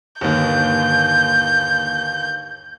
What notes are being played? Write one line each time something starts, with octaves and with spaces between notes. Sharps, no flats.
G1 D#2 G6